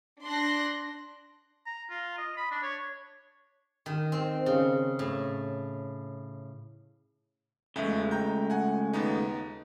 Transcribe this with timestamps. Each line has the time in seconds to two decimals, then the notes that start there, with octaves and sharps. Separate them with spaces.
0.23 D4 C6 F#6 A#6
1.66 A#5
1.90 F4
2.18 D#5
2.37 B5
2.51 D4
2.63 C#5
3.86 D#3
4.12 C4
4.46 C#3
4.99 A2
7.76 E2 C#3 G#3 A3 E5
8.11 G5 A#5 G6
8.50 F#5 G#5
8.93 D#2 B3 D#4